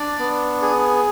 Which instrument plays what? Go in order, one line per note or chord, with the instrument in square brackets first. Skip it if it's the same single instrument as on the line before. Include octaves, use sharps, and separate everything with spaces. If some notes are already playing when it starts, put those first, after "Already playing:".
Already playing: [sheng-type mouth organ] D4 D5
B3
G#4